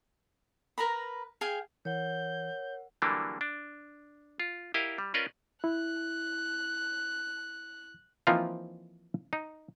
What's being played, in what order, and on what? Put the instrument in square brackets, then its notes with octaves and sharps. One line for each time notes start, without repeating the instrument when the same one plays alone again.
[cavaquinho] A#4 B4 A#5 B5
G#4 F5 G5 G#5
[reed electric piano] E3 [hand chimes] A#4 F#5 [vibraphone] C#5 [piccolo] G6
[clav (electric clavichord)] D3 E3 F#3 G3 A#3 D4
D4
F4
E4 G4 A#4 D#5 F5
G3
C#4 F4 A#4 B4 D5 D#5
[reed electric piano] E4 [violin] F#6
[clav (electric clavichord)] E3 F3 A#3 C4 D#4 F4
D#4